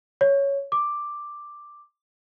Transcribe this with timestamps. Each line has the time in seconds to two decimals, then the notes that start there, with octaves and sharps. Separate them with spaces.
0.21 C#5
0.72 D6